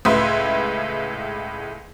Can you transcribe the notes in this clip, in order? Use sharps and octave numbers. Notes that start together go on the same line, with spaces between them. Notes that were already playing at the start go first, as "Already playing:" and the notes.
C#2 A2 B4 E5 C6